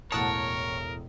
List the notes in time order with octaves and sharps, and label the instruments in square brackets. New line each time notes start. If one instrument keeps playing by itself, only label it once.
[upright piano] E1 A2 D#6 [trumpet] A#4 [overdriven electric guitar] C#5 [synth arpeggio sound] F#5 A5